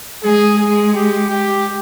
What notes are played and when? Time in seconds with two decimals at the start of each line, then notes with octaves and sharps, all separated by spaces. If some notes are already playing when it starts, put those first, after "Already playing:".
0.23 G#3 G#4
0.58 G#4
0.93 G4
1.28 G4